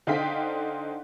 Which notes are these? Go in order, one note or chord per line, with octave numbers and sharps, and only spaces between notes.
D3 D#4 C5 F5 G5 B6